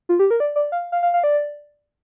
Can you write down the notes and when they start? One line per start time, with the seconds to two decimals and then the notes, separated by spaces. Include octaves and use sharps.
0.09 F4
0.19 G4
0.31 A#4
0.40 D5
0.56 D5
0.72 F5
0.92 F5
1.03 F5
1.14 F5
1.24 D5